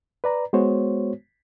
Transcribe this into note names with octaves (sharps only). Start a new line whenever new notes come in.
B4 D5 A#5
G#3 B3 F#4 C5 C#5